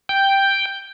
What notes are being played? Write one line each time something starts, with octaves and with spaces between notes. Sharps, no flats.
G5